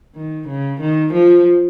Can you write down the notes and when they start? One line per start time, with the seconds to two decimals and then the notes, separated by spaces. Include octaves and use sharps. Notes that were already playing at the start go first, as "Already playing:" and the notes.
0.15 D#3
0.48 C#3
0.80 D#3
1.13 F3